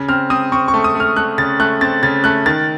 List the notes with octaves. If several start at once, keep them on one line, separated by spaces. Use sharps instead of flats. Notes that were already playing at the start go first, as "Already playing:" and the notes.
Already playing: C#3
C4 F6
C4 D#6
C4 C#6
C#6
A3
D#6
A3 F6
A3 F#6
C#3 A6
A3 F#6
C4 A6
C#3 A6
A3 F#6
D#3 A6